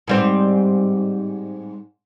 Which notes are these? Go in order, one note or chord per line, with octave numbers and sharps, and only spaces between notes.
G#2 G3 C4